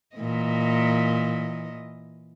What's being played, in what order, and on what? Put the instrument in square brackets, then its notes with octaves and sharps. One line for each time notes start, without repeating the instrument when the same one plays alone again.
[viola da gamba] A#2 E3 D#5